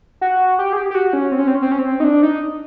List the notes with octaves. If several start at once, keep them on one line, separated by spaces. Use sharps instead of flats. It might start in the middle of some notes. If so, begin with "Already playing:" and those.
F#4
G4
G#4
G4
G4
F#4
C#4
C4
C#4
C4
C#4
C4
C#4
C4
D#4
D4
D#4